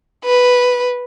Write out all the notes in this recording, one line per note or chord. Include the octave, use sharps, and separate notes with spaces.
B4